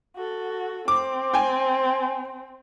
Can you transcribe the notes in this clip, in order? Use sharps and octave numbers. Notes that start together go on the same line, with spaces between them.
F#4 A4
C4 D6
G5 G#5